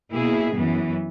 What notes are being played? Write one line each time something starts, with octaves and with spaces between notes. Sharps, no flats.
B2 A#3 E4 G#4
F#2 E3 B3